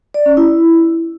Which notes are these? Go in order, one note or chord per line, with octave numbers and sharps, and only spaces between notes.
D5
C#4
E4